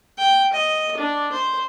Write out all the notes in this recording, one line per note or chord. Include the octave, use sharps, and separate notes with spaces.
G5
D#5
D4
C5